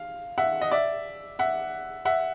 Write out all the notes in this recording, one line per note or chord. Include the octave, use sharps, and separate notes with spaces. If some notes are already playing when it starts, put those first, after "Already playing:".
Already playing: F5
E5 F#5
D#5
D5 E5
E5 F#5
E5 F#5